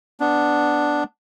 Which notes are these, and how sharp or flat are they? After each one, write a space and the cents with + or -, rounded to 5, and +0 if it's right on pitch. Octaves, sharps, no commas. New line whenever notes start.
B3 +0 D4 +0